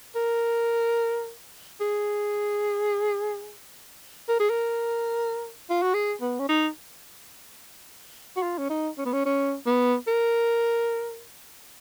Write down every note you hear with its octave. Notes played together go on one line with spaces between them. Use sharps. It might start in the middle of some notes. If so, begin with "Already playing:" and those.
A#4
G#4
A#4
G#4
A#4
F4
F#4
G#4
B3
C#4
D#4
F#4
F4
C#4
D#4
C#4
B3
C#4
C#4
B3
A#4